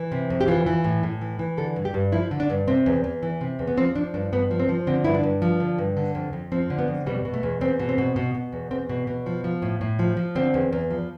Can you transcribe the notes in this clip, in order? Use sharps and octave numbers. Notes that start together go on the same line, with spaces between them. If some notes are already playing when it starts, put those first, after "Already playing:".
Already playing: E3
C3
F2
G4
E3 F4
E3
A2
A2
E3
E3
D3 A4
G2
G4
G2
F3 E4
D3
D4
G2
C3 C4
E2
E2
E3
C3
E2
B3
F3 C4
F3 D4
G2 D4
G2 B3
F3
C4
F3
D3 C4
G2 E4
D4
G2
F3
D3
G2
D3
F2
F2
F3 C4
D3
B3
F2
B2 G3
B2
A3
E2
E2 C4
B2
C4
B2
B2
B2
E2
E2 C4
B2
B2
F3
F3
A2
A2
F3
F3
D3 C4
E2
E2
F3